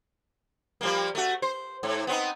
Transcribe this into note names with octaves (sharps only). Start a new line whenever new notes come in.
F3 G3 A#3
A3 F#4
C5
G#2
B3 C4 D#4